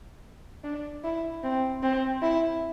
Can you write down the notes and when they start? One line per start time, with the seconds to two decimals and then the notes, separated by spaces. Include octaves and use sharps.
0.64 D4
1.04 E4
1.43 C4
1.83 C4
2.22 E4